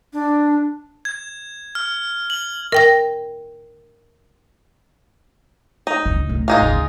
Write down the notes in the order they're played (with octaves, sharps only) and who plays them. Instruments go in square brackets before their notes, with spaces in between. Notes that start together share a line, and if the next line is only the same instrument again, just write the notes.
[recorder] D4
[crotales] G#6
F6
F#7
[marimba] A#4 G5 A#6
[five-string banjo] D#4
[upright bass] D1 C#2
A2
[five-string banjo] G#3 D#4 F4
[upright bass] D2 C#3